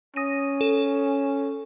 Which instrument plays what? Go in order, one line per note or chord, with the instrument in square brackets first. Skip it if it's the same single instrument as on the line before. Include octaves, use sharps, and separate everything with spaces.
[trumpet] C#4 [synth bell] D#6 A#6 D#7
[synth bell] A4